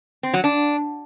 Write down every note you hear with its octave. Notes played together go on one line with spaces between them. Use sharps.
C4
F#3
D4